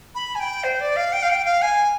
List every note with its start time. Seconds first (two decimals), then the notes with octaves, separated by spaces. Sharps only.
0.15 B5
0.35 G#5
0.40 G5
0.64 C5
0.80 D5
0.96 F5
1.12 G5
1.22 F5
1.30 G5
1.45 F5
1.62 G#5